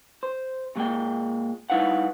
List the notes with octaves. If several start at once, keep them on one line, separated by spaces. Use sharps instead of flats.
C5
A#2 F#3 G#3 A#3 G5
G3 D#4 E4 B4 F5 F#5